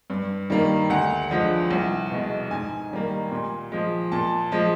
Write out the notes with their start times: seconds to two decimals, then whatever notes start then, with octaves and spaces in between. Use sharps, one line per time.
0.10 G2
0.50 D#3 G3 A#3
0.90 D2 F#5
1.31 D3 F3 G#3
1.71 C2
2.11 B2 G#3
2.51 G#2 G#5
2.91 D#3 G3 A#3
3.32 A#2
3.72 F3 G#3
4.12 A#2 A5
4.52 F3 G#3